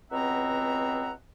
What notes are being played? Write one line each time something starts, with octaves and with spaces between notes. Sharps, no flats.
C#2 B2 C4 E5 F#5 A#5